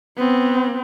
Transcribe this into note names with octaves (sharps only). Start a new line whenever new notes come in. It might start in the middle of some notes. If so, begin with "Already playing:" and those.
B3 C4